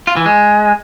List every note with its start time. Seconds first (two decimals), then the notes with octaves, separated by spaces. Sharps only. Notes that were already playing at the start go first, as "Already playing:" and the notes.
0.07 F4
0.17 E3
0.26 G#3